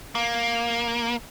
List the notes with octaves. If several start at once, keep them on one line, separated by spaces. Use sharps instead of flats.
A#3